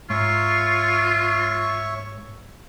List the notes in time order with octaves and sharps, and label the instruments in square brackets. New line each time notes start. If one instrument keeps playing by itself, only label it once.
[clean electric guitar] G#2 [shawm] F4 [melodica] C#5 E5 C#6